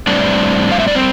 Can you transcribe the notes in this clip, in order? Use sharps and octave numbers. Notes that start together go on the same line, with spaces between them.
A2 G3 C4 D4 D5
F5
E5
D5
C4 C5